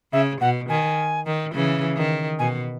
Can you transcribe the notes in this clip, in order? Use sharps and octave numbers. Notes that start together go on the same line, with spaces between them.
C#3 E5
B2 F#5
D#3 G#5
D#3
C#3 E3
D#3
B2 G#5